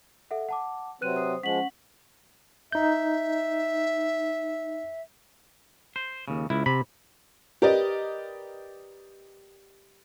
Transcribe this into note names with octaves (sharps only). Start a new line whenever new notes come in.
A4 E5 F#5
F#5 A5 D6
C3 F#3 C4 B4 F#6 D#7
C5 D#6
F3 G#3 C#4 F#5 B6 F#7
D#4 E5 G6
C5
D#2 C#3
C#2 E4
C3 B5
G4 A#4 B4 D5 D#5